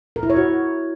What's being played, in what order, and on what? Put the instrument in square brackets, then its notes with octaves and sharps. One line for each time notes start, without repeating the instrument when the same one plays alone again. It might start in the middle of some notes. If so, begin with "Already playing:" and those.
[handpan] A#4
E4
C#5
F#4